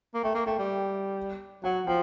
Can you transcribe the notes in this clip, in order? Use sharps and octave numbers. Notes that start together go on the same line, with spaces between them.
A#3
A3 G5
A#3
A3 G5
G3
F#3 F#5
F3 G5